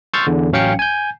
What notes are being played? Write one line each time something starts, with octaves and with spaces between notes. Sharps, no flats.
C6 C#6 E6 F6 G6 A6
E2 D3
A1 F#3 C#4 F5 G5 C#7
G#5 G6